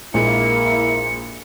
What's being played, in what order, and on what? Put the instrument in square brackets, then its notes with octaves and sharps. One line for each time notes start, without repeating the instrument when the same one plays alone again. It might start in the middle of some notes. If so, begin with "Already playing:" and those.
[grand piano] A#1 A#2 G#3 [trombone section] A#3 E4 [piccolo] C#7